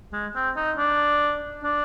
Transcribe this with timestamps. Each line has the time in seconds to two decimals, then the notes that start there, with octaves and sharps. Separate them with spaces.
0.13 G#3
0.35 C4
0.56 D#4
0.78 D4
1.63 D4